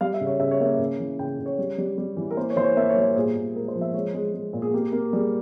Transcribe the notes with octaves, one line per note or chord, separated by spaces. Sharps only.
G3 F5
E5
C#3
C#5
C#3 E5
C#5
A#3 E5
C#3
E3
C#3 G5
C#3
C#5
G3
G3
G3
E3
A#4
A#3 C5
C#5
E3 C5
C#5
A#3 E5
C#5
G3
C5
A#2 G#4
A#2
G#3 A#4
C5
F3
E5
G#3 C#5
G#3
G#3
A#2
G#4
A#3 G4
A#3
G3 G#4